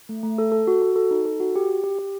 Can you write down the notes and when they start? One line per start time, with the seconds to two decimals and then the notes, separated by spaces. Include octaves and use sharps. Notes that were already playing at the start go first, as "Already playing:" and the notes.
0.09 A3
0.23 A3
0.38 A4
0.52 A4
0.67 F#4
0.82 F#4
0.96 A4
1.11 D#4
1.25 A4
1.40 F#4
1.56 G4
1.70 G4
1.84 G4
1.99 G4